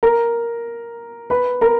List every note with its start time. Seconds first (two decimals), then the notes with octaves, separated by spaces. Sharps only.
0.03 A#4 A#5
1.30 B4 B5
1.61 A#4 A#5